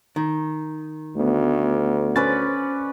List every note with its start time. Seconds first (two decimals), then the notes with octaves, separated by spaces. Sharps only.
0.16 D#3
1.16 D2 A3 B3
2.16 C#4 B4 C5 D5 A6